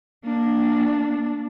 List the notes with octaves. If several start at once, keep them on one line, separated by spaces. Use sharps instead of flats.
A#3 D4